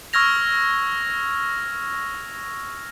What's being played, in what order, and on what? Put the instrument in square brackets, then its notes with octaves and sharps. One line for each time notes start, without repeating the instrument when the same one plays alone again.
[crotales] C#6 E6 F6 G#6 A#6 F7